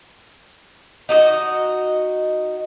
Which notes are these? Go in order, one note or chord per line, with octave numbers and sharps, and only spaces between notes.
D#4 F#4 D#5